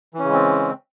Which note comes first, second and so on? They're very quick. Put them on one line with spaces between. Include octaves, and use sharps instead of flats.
E3 C#4 C#3 G#3 C4